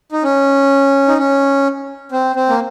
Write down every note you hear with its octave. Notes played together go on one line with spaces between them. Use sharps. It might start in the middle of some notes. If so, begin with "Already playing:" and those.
D#4
C#4
D#4
C#4
C4
C4
A#3